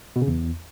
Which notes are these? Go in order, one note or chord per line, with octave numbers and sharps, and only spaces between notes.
B2
C#3
E2